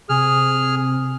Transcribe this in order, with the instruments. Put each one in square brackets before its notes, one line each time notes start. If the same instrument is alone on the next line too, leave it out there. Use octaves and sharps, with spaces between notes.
[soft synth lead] C3 [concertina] G#4 F6